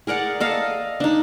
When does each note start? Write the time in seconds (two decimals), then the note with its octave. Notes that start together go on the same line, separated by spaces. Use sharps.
0.07 G#4 A#4 D5 F#5
0.40 A4 D#5 F5
1.00 D4 D#4